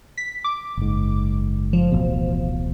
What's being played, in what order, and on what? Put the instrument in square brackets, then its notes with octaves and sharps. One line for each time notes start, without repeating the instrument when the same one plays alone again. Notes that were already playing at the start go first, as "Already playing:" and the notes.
[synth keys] B6
D6
[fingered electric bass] F#1 G#2
[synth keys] F3
[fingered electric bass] D1 A1 B2